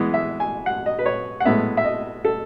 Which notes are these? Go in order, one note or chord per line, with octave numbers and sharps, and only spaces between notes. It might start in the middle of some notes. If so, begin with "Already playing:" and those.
Already playing: E3 G#3 B3 D#5
E5
G#5
F#5
D#5
B4
C#5
F#5
A2 G#3 B3 E5
E5
D#5
A4